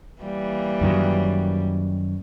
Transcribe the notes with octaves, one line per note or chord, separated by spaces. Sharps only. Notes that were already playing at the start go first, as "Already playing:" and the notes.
E3 G3 A#3
F#2 D#3 F#3